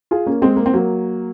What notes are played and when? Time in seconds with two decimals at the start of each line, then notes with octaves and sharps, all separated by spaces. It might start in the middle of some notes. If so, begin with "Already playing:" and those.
0.11 F4 G#4
0.27 A#3 C#4
0.42 G#3 C4
0.56 A#3
0.66 C4
0.73 F#3 A#3